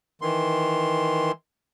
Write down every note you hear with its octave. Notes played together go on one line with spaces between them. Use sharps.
D#3 E3 C6